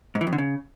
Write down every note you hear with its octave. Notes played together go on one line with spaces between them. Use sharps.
G#2
E3
F2
D3
C#3